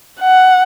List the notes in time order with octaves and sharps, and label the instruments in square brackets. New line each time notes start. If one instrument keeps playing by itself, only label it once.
[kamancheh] F#5